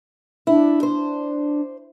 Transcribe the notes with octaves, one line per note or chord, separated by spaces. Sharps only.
D4 E4
C5